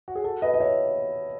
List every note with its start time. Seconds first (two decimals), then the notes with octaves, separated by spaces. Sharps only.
0.08 F#4
0.15 G#4
0.24 F#4 A4
0.42 B4 D#5
0.54 D#5
0.60 C#5 E5